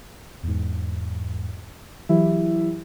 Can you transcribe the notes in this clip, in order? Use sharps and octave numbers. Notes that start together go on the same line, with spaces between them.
E2 G#2
E3 F#3 E4 G4 E5